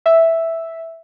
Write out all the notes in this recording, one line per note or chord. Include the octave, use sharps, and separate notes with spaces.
E5